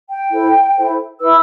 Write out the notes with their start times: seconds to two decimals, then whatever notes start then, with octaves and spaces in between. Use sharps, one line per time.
0.09 G5
0.31 E4 A4 C5
0.76 E4 A4 C5
1.20 E4 B4 E6